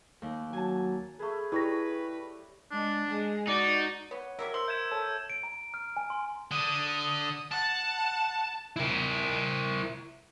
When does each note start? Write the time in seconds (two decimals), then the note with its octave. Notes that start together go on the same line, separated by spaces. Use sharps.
0.22 D#2
0.53 F#3 G#5 A5
1.19 A3 G#4 B4
1.52 G3 E4 B4 C#5 A#6
2.71 G#3 D4
3.07 G#3 G#4
3.48 D#4 F#4 D5
4.11 B3 C#5 F#5
4.39 F#3 G3 A#4 E5
4.54 C5 C6 E6
4.68 E5 G6 G#6 E7
4.91 A4 C#5 A5
5.30 D7
5.43 A#5
5.74 F6
5.97 G#5
6.10 C6
6.51 D3 D#6
7.52 F#5 A5
8.76 E4 A#4